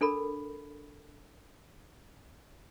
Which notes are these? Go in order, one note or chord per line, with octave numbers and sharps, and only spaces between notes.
D4 A4 A#4 B5